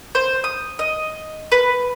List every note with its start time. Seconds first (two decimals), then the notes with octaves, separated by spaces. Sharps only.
0.15 C5
0.44 D#6
0.79 D#5
1.52 B4